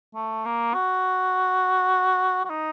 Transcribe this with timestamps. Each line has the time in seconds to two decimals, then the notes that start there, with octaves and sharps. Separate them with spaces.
0.15 A3
0.45 A#3
0.74 F#4
2.45 F#4
2.50 D#4